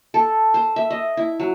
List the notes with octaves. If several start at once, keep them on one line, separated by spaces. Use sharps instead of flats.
A4
C5
E5
D#5
E4
F#3